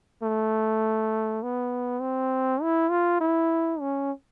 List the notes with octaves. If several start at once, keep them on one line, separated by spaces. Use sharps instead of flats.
A3
B3
C4
E4
F4
E4
C#4